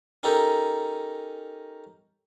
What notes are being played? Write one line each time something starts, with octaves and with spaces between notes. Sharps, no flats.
C#4 D#4 G4 A4 A#4